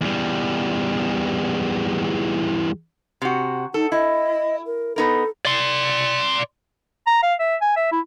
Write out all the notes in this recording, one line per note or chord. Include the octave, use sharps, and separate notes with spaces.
E2 G3
C3 F#4
D#4 A4
E4 D#5
A#4
B3 D#4 A4 A#4
D5 C6
A#5
F5
E5
G#5
E5
E4